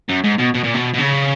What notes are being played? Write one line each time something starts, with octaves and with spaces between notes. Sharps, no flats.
F#2
G#2
B2
B2
A#2
B2
B2
C#3